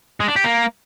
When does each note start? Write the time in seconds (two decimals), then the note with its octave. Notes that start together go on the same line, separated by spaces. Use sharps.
0.20 G#3
0.28 D4
0.36 G4
0.44 A#3